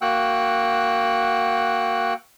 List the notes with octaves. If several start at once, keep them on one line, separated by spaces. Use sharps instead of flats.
A#3 F#4 F#5 G5 E6 F#6